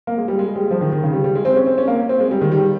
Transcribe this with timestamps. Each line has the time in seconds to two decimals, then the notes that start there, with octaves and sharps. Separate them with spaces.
0.07 A#3
0.18 G#3
0.28 G3
0.39 G#3
0.56 G3
0.71 F3
0.81 D#3
0.92 D#3
1.03 C#3
1.13 G3
1.24 G3
1.35 G#3
1.45 C4
1.56 C#4
1.67 C4
1.78 C#4
1.88 A#3
2.09 C4
2.20 G#3
2.31 G3
2.41 D#3
2.52 G3